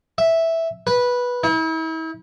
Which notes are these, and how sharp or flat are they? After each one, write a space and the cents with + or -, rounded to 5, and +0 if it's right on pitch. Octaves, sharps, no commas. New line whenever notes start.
E5 -5
B4 -10
E4 -40